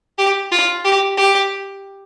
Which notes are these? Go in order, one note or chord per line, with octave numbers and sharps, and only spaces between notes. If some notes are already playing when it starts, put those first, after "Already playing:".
G4
F4
G4
G4